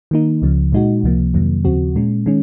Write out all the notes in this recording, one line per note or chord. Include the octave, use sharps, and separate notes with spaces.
D#3 A#3 D#4
C#2 C#3 F3
A#2 G#3 D#4 F#4
C#2 C3 F3 A#3
F2 C3 D#3 F#3 A#3
D#2 C#3 F3 C4 F#4
A#2 G#3 C#4
D#3 G#3 C#4